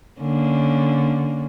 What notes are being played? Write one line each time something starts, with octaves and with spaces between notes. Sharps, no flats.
D3 A#3 C#4